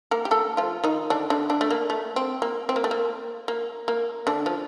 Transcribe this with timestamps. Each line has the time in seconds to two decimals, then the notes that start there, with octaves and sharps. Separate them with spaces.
0.11 A#3 A#4
0.25 G4
0.31 A3 A4
0.57 F3 F4
0.84 D#3 D#4
1.10 D3 D4
1.30 D3 D4
1.50 D3 D4
1.61 A3
1.71 A#3
1.90 A3
2.16 C4
2.42 A#3
2.69 C4
2.76 A#3
2.84 A3
2.91 A#3
3.48 A#3
3.88 A#3
4.27 D3 D4
4.46 F3